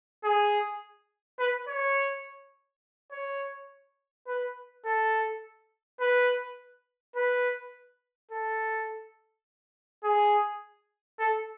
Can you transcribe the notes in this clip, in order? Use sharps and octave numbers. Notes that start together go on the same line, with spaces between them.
G#4
B4
C#5
C#5
B4
A4
B4
B4
A4
G#4
A4